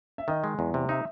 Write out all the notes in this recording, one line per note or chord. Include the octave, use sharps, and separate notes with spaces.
E5
D#3 D#5
G#3
E2
C3
D#4 E5